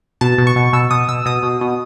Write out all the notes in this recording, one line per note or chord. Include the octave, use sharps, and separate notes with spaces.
B2 A5
B2
C#6
B2
B2 E6
B2 D#6
B2 E6
B2 D#6
B2
B2